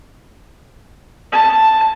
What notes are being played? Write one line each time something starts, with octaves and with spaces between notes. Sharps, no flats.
A5